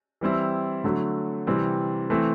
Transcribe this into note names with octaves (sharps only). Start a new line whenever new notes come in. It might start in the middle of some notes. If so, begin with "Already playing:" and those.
E3 G3 C4 E4
D3 F#3 A3
C3 E3 G3 C4
E3 A3 C4